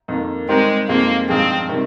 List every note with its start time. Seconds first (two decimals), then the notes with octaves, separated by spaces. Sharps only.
0.08 F2 D#3 A#3
0.49 D#3 G3 G#3 C4 G4 A#4
0.88 F2 D#3 G#3 A#3 C4 F4
1.29 G2 F3 G#3 C4 D#4 G#4
1.69 C3 D#3 G3